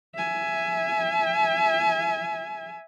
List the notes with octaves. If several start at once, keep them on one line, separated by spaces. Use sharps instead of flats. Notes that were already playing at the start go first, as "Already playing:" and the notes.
E5 G#5